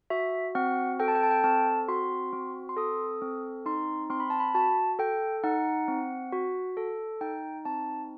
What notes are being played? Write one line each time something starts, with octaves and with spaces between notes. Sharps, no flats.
F#4 E5
C4 F#5
A4 G5
A5
G5
A5
G5
C4 A5
F#4 C6
C4
C6
A4 D#6
C4
D#4 C6
C4 C6
B5
A5
B5
F#4 A5
A4 G5
D#4 F#5
C4
F#4
A4
D#4 G5
C4 A5